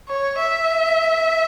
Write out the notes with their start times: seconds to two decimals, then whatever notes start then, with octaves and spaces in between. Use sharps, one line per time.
0.08 C#5
0.39 E5